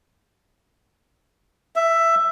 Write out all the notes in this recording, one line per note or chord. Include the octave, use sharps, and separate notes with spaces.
E5